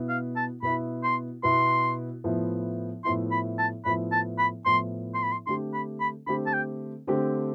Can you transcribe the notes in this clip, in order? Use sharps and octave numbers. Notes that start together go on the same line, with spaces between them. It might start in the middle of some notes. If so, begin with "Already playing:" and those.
Already playing: B2 B3 E4
F5
A5
B2 B3 E4 B5
C6
B2 B3 E4 C6
A2 F3 B3 E4
A2 F3 B3 E4 C6
B5
A5
A2 F3 B3 E4 B5
A5
B5
A2 F3 B3 E4 C6
C6
B5
C6
D3 A3 C4 G4 C6
B5
B5
D3 A3 C4 G4 B5
A5
G5
D3 A3 C4 G4